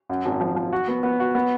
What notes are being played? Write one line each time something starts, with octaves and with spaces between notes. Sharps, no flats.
F#2
G#1
F3
F3
F#4
B3
B3
F#4
B3